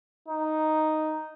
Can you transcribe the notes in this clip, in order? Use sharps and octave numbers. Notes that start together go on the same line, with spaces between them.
D#4